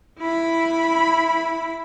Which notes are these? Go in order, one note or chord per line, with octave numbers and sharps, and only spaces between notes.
E4 B5